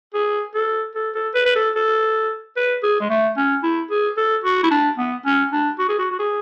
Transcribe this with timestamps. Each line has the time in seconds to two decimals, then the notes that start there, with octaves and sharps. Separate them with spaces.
0.14 G#4
0.54 A4
0.95 A4
1.15 A4
1.34 B4
1.46 B4
1.55 A4
1.75 A4
2.56 B4
2.83 G#4
3.01 G#3
3.10 A3
3.37 C#4
3.63 E4
3.90 G#4
4.17 A4
4.44 F#4
4.63 E4
4.71 D4
4.98 B3
5.25 C#4
5.52 D4
5.79 F#4
5.89 G#4
5.98 F#4
6.11 F#4
6.19 G#4